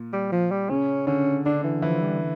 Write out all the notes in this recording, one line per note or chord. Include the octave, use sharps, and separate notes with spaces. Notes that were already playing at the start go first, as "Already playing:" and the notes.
Already playing: A#2
G3
F3
G3
C#3 C#4
D3 C#4
D3 D4
E3
E3 F3
G3